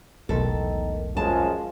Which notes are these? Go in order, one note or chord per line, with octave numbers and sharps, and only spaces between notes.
E1 B1 A2 D#3 A4
F#2 F3 G#3 F4 A5